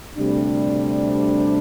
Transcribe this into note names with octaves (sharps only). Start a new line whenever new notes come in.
D2 C3 G3 D4